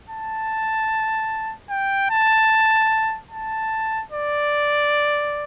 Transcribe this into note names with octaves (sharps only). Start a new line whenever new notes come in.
A5
G5
A5
A5
D5